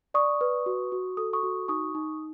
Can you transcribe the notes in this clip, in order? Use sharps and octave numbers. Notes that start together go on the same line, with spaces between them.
D5 C#6 D#6
B4
F#4
F#4
A4 D#6
C#6 D#6
F#4
D#4 C#6 D#6
D#4